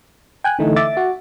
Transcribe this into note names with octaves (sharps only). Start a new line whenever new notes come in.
G5 G#5 F#6
D3 E3 A3 D#4
E5 D6 A6
F#4